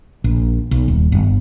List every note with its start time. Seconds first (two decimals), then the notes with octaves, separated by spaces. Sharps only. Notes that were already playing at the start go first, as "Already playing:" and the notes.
0.24 A#1
0.71 B1
0.88 D#1
1.12 G1